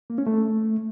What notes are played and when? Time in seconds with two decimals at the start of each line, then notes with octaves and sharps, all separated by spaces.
0.10 A#3
0.18 C#4
0.27 A3